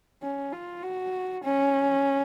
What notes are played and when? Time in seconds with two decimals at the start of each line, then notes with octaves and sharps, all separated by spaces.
0.23 C#4
0.53 F4
0.83 F#4
1.44 C#4